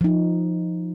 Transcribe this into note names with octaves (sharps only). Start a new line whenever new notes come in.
F3 D#4